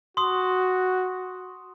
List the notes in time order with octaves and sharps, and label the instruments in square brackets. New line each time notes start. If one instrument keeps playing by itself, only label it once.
[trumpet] F#4 [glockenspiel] C6 D#6